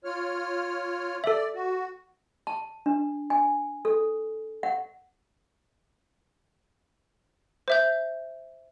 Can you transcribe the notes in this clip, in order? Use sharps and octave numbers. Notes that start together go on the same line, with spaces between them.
F4 C#5 F6
A4 D5 E5
F#4
A5
D4
G#5
A4
F#5
C5 E5 G6